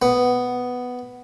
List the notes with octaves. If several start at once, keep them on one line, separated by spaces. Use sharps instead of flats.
B3